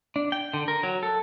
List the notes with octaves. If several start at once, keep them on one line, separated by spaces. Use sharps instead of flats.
D4
G5
D3
A#4
F#3
A4